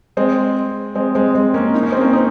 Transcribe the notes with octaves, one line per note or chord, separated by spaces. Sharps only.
G#3 C4
G#3 C4
G#3 C4
G#3 C4
A#3 C#4
D#4
C#4
C4
A#3 C#4
C4 D#4